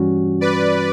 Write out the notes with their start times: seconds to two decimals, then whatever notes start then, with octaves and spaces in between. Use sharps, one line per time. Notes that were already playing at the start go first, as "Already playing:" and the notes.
Already playing: G2 E3 G3 C#4 F#4
0.41 B4 D5